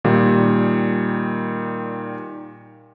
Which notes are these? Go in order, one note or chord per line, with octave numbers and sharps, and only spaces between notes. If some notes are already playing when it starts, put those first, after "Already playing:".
A#2 D#3 G3